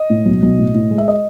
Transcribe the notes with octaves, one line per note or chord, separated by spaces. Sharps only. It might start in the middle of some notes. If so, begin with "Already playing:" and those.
Already playing: D#5
A2
B1
B1
A2
A2
G#3
E5
D#5